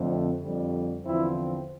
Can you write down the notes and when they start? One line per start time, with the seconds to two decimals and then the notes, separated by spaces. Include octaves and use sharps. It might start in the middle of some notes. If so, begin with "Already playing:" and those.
Already playing: F2 D3 A3 C4
0.41 F2 D3 G3
1.04 E2 D3 F3 C4 E4